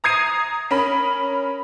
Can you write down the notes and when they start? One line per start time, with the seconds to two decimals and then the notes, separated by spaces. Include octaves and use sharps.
0.04 A#5 D#6 G#6 C7 D#7
0.71 C#4 A#4 B5